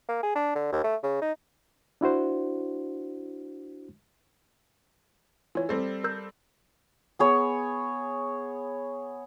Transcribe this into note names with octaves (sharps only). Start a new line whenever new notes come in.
A#3
G#4
D4
D3
D#2
A3
C#3
D#4
D4 E4 F#4 C5
E3 F4 C#5
G3 C4 A4
A#4 E6 G6
B3 G#4 C#5